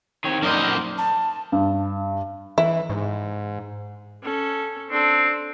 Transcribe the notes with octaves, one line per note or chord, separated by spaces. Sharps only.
D#3 C4 C#5
F#2 A#3 D#4 A#4 C5 D5 D#5
A5
G2
E3 E4
G#2
C#4 A4
C4 D4 A4